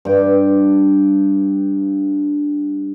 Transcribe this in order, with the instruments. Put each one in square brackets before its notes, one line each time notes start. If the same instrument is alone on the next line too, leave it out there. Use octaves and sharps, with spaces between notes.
[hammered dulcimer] G2 G5